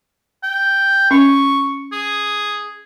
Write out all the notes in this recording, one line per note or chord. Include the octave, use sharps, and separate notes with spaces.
G5
C#4 C#6
G#4